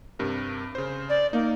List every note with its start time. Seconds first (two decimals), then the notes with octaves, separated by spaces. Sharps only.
0.19 G2 C3 A#4
0.75 C#3 C5
1.09 D5
1.33 A#3 D#4